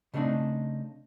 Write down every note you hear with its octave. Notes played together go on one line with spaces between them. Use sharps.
C#3 G3 A3 C4 D4 D#4